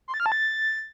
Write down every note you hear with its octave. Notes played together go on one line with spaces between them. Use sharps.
C6
A6
F6
A5
A6